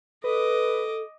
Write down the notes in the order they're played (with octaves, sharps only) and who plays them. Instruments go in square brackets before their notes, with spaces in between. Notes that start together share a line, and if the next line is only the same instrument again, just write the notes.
[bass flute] A4 [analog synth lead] B4 [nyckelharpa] D#5 D6